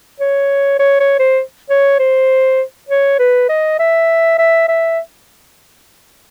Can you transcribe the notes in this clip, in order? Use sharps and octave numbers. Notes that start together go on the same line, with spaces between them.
C#5
C#5
C#5
C5
C#5
C5
C#5
B4
D#5
E5
E5
E5